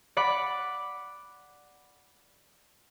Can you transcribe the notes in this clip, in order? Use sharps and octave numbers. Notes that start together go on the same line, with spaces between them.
D5 F#5 B5 D6